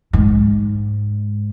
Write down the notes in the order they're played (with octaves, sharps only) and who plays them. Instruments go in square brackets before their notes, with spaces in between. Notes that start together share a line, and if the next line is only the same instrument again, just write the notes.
[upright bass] G#2